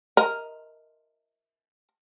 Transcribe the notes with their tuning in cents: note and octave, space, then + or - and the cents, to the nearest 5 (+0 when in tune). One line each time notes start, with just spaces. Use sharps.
A#4 +0 D#5 +10